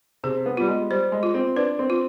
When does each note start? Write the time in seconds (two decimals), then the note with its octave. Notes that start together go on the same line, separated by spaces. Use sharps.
0.24 C3 G#4
0.46 B3
0.57 G3 F4
0.68 G#3
0.90 G3 C5
1.12 G#3
1.23 F4
1.34 C4
1.56 D4 B4
1.79 C4
1.90 F4